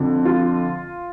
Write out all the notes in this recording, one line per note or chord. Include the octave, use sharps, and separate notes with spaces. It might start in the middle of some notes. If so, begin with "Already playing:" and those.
Already playing: F2 D3
F4